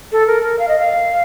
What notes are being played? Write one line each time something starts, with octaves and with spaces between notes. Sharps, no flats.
A4
A#4
A#4
F5
D#5
F5